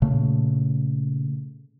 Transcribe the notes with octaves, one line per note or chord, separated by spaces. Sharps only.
A#2 C#3 A3